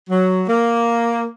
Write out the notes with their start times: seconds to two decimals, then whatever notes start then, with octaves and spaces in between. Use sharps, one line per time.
0.09 F#3
0.48 A#3